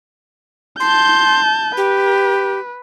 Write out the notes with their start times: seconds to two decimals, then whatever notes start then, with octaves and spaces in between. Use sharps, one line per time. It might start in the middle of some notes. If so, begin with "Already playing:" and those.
0.80 A5 C6 G6
1.77 G4 B4